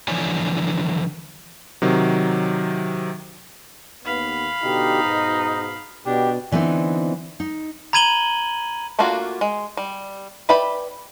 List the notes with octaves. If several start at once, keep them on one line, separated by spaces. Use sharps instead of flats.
D3 E3 F3 C#5 D5 G#5
C3 D#3 F#3
D#2 B3 F5 B5
B2 D3 D#4 G4
G#2 B2
B2 D4 G4
D3 E3 G#3 B3 C4 D#4
D#4
A#5 B5 G#6 D#7 F#7 G7
A3 A#3 D4 F4 F#4
G#3
G3
B4 D5 E5 G5 B5